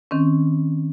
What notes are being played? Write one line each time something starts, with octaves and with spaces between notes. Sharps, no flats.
D#3 C4 C#4